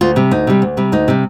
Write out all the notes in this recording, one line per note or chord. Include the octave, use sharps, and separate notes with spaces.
D2 F4
C3 G3
D2 D#4
C3 G3
D2
C3 G3
D2 D#4
C3 G3